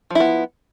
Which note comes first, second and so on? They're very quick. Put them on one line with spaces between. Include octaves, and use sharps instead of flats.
F3 E4 B3